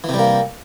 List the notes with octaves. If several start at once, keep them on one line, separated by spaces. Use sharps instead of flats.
C3 E3 G3 A#3